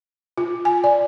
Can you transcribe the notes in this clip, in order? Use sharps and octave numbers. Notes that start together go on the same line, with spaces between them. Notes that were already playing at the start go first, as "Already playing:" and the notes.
F4
G#5
D5